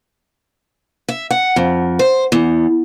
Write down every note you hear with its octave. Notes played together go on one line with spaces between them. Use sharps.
E5
F#5
F2
C5
E2